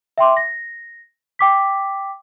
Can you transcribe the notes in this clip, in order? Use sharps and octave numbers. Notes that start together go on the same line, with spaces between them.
E5 G5 C6 D6
A#6
G5 D6 B6